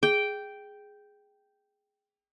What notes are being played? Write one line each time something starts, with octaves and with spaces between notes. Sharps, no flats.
G#4 G5